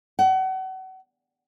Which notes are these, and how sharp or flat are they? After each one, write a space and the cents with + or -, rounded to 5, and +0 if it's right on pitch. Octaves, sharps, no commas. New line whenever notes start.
F#5 +35